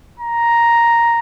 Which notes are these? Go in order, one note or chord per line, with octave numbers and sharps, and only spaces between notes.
A#5